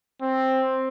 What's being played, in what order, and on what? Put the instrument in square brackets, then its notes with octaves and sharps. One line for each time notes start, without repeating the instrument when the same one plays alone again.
[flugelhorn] C4